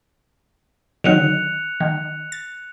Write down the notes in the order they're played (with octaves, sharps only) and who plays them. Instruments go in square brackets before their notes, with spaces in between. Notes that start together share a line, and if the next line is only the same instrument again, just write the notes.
[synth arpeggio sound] D3 D#3 F#3 [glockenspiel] F#6 C#7 F7
[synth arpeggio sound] D#3
A6